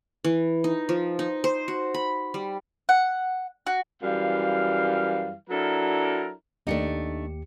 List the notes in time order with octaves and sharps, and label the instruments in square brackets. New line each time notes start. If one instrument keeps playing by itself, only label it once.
[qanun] E3
D#4
F3
D#4
C5
F#4
B5
G3
[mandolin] F#5
F#4
[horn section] F#2 E3 G3 F5
F#3 D4 E4 A4 A#4
[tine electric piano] D#2 G4 C#7 [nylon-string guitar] A3 D4 D#4